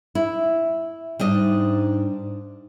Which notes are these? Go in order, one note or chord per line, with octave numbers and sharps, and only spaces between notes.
E4
G#2 G3 D4 D#5